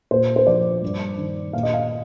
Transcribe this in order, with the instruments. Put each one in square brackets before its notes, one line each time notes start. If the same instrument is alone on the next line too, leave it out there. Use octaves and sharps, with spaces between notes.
[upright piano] A#2 C5
C5
F3 D5
G2
D#3
A#2 F5
D#5
F5